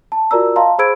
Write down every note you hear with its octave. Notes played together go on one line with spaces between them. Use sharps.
A5
F4 F#4 A#4 D5 A#5 E6
D#5 F5 A5 A#5 C6
G#4 C5 B5 E6 G#6 D7